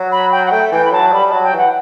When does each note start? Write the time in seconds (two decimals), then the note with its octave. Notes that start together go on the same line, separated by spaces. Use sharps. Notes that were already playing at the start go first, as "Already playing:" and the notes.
Already playing: F#3
0.12 B5
0.32 G5
0.46 F#5
0.52 A3 G5
0.72 E3 G5
0.85 B5
0.93 F#3 A5
1.12 G3 B5
1.28 A5
1.33 F#3
1.43 G5
1.53 E3 F#5